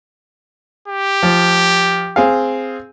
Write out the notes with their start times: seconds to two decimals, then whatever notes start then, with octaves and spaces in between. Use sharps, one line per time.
0.88 G4
1.23 F3
2.16 C4 G#4 F5